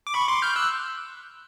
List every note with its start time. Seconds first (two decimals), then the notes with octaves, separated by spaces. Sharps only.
0.07 D6
0.14 B5 C#6
0.28 C6 D6
0.42 F6 G6
0.56 E6 F#6